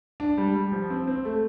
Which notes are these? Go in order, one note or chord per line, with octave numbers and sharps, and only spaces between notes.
D4
G3
G3
F3
C4
C4
A3